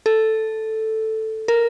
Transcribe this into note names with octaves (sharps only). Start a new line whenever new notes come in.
A4
A#4